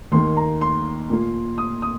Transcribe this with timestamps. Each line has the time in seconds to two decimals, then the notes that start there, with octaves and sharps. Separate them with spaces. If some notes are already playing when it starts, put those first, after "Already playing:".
0.12 D#2 D#3 A#3 C6
0.37 A#5
0.61 C6
1.09 A#2 A#3
1.58 D#6
1.82 D#6